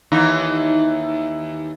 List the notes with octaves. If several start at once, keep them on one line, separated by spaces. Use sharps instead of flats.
D#2 E3 D#4